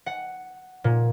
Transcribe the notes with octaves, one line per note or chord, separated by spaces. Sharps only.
F#5
A#2